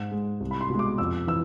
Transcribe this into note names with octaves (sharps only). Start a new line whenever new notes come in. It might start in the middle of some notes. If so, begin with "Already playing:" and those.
Already playing: G#2
G#3
C2
B5
C6
B2 G#3
D6
F2 E6
E3 E6